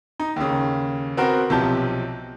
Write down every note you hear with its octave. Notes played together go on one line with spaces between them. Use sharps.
D#4
D#2 C#3
B3 C4 F#4 A#4
B1 C3 F3 G4 A5 G6